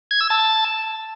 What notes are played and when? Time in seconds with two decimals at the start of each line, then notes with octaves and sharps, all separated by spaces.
0.11 G#6
0.21 E6
0.30 A5